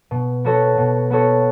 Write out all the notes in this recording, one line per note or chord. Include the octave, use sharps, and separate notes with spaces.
B2
B3 F#4 A4 C#5
B2
B3 F#4 A4 C#5